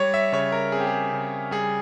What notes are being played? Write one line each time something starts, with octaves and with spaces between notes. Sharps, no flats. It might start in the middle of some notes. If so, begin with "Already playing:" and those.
Already playing: G3 C#5
E5
C#3 C#5
A#4
C4 G#4
G4
G#4
C#3
G3 G#4